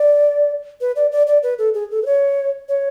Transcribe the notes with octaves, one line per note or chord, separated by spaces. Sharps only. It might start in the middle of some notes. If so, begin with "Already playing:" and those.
Already playing: D5
B4
D5
D5
D5
B4
A4
G#4
A4
B4
C#5
C#5